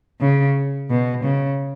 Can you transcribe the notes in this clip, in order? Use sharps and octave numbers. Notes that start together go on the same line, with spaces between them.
C#3
B2
C#3